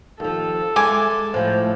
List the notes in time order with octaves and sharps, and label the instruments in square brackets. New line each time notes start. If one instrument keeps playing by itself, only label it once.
[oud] D#2 F3 [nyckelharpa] A4
[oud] G#3 E5 [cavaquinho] G#5 D6
[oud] A2 F3 A3 [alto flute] C5